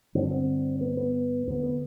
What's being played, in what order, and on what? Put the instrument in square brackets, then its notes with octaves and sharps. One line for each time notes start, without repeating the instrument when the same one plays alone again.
[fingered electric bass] G2 D3 C4
D4
C4
B3
B3
E2 D3 B3
B3